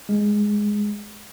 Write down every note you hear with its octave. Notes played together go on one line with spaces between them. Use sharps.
G#3